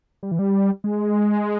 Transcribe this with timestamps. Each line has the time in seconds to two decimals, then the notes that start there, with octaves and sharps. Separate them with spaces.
0.23 G3
0.31 E3
0.39 G3
0.84 G#3